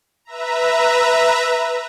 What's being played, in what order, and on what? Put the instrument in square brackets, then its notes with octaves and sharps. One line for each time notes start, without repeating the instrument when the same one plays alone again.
[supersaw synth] B4 E5 A#5